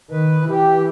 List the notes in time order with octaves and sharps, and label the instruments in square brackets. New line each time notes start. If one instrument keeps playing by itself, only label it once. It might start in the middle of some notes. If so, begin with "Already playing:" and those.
[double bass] D#3 [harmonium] B4
[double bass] E3 [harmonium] G4